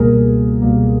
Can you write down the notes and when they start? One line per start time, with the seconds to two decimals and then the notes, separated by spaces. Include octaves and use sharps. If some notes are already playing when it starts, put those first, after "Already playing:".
Already playing: C#2 B2 G3 A#3 G#4 A#4
0.62 C#2 B2 G3 A#3